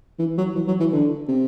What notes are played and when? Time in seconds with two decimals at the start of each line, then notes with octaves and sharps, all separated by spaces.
0.19 E3
0.38 F#3
0.55 E3
0.68 F#3
0.80 E3
0.92 D3
1.28 C3